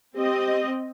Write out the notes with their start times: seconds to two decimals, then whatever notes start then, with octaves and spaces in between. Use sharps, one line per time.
0.16 C4 G4 D#5